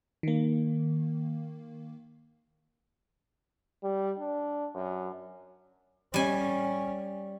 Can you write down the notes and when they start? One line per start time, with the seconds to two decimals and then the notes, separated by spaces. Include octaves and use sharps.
0.23 D#3 A#3
3.83 G3
4.19 D4
4.75 F#2
6.14 G3 C#4 G#5